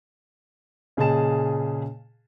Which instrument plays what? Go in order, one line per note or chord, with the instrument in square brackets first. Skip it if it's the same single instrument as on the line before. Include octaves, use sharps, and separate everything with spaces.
[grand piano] A#2 C#3 G#4 D#5 A5 E7